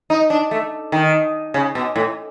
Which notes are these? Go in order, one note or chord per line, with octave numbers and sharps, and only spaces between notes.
D#4
D4
A3
D#3
C#3
B2
A2